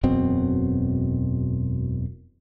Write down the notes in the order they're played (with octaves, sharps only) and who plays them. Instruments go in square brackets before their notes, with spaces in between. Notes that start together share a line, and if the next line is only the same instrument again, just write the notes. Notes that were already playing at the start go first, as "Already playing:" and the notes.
[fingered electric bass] E1 F#2 B2 C4